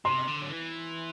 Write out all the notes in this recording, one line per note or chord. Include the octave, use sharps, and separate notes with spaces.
C3 C6
D3
F#3
E3